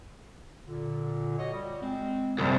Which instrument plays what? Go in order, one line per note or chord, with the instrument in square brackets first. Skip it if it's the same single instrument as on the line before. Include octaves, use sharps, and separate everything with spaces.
[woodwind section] A#2 D3
F#4 C#5 D#5
G3
G#3 C4
[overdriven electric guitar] C2 F#2